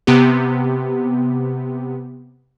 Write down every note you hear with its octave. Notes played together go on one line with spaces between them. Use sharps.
C3 B3 G4